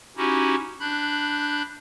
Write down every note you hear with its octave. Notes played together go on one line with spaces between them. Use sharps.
C#4 D#4 E4 F#4 G4
D4 B5 F#6 G6